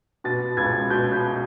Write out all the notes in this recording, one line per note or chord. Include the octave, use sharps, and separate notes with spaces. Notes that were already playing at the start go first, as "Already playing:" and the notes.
B2 A6
C#2 G#6
B2 G6
G6